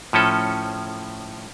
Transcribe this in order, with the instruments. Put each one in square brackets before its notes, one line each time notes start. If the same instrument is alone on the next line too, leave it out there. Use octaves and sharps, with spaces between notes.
[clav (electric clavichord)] A2 F3 C#4 A4